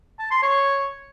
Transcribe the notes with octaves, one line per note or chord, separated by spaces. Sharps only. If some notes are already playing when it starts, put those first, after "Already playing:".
A5
C6
C#5